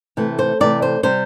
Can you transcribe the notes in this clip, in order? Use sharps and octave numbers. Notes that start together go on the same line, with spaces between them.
C3 E3 A3
C5
C3 E3 A3 D5
C5
C3 G3 C4 C5